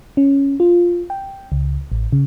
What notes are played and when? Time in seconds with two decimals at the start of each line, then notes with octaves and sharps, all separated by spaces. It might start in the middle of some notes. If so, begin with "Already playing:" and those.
0.17 C#4
0.60 F4
1.10 G5
1.52 C#2
1.92 A1
2.13 C#3